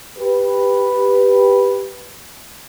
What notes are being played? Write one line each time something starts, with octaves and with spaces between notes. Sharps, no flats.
G4 B4